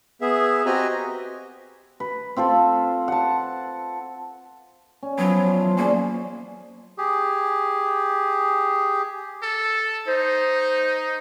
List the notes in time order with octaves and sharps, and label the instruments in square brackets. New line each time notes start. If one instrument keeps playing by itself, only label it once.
[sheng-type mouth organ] B3 G#4 E5
C4 F#4 G4 D#5 G#5 A#5
[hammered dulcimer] B4
C4 F4 A4 C5
F#5 A5
C#4
[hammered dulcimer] F3 B3 [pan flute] F#3
[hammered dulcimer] C5 F5
E3
[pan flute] A#3 [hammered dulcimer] C#4 G#4 D5
[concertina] G4 G#4
[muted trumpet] A4
[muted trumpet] D#4 [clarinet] C5